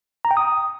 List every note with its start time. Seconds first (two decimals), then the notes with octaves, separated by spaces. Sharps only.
0.25 A#5
0.31 G5
0.37 D#6